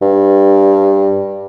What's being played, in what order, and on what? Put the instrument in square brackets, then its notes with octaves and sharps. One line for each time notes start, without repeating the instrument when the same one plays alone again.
[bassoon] G2